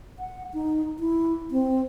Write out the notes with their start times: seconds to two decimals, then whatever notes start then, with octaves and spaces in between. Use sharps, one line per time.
0.19 F#5
0.54 D#4
1.00 E4
1.51 C4